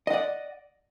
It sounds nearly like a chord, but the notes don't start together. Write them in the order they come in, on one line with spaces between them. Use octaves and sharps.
D#5 F#5 D5